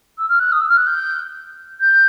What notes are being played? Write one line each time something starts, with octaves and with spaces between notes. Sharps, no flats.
E6
F6
F#6
D#6
E6
F6
F#6
G6
G6